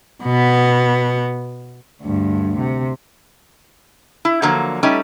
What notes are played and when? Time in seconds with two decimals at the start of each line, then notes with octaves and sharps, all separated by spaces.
0.23 B2 B3
2.03 D2 G2
2.59 C3
4.25 E4
4.42 D3 F3 F#3 A#3
4.83 G3 A3 C#4 D#4